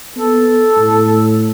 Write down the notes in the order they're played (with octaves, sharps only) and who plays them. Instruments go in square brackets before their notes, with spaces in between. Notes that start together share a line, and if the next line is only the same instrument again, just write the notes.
[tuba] B3 [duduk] A4
[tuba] A2